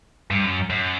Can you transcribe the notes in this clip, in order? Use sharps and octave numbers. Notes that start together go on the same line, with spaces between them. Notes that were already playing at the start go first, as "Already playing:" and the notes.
G2
F#2
F#2